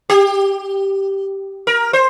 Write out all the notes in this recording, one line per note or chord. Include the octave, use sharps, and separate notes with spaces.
G4
A#4
C5